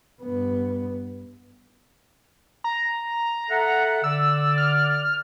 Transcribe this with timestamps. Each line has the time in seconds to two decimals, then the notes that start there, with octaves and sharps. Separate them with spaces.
0.22 G2 B3
2.64 A#5
3.51 A4 E5 F#5
4.04 D3 D5 E6
4.58 F6